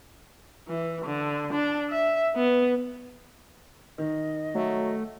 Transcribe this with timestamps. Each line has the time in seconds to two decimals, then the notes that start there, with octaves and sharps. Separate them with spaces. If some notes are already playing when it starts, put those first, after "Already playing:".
0.68 E3
1.05 D3
1.53 D4
1.90 E5
2.36 B3
3.98 D#3 D#5
4.55 F#3 A3